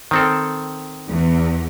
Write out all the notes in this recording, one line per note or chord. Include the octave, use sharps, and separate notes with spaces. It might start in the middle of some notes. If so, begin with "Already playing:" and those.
D#3 C4 A4
E2